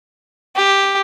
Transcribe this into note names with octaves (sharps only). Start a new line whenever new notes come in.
G4